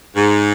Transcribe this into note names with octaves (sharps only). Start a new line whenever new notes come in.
G#2